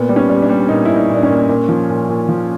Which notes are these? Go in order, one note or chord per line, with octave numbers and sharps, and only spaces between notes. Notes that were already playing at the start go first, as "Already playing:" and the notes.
Already playing: A#2 B3
G3
C#4
G3
D4
G3
A#2 D#4
A#2 E4
D#4
A#2
D4
C#4
A#2
A#2
F3
A#2
A#2
F3